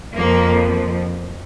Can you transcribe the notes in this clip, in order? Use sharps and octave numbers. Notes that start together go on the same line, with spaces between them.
F2 F3 A#3